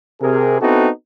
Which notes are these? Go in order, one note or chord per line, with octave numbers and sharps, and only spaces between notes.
C3 G#4 A#4
B3 C4 D#4 E4 F#4 A4